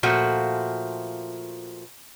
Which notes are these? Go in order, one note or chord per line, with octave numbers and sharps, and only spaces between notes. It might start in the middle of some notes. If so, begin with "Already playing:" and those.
A#2 F3 A3 F#4